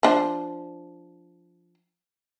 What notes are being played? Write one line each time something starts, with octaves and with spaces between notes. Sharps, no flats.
F3 D4 C5